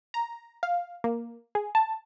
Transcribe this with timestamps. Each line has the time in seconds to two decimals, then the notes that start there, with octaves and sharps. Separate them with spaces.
0.14 A#5
0.63 F5
1.04 A#3
1.55 G#4
1.75 A5